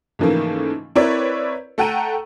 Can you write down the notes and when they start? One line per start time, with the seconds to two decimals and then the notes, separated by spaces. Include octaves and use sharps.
0.19 G#2 C#3 E3 F3 A3 A#3
0.95 C4 E4 A#4 B4 C#5 D5
1.78 A3 A4 F#5 G5 A#5 D#7